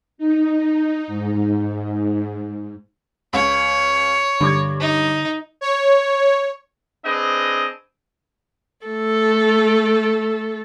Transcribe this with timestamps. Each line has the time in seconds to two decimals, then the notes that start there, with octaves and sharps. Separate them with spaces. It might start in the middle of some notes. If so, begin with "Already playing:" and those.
0.18 D#4
1.07 G#2
3.33 C#2 C#5
4.41 G2 D3 D6 G#6
4.80 D#4
5.61 C#5
7.05 C4 D4 G#4 B4 D#5
8.86 A3 A4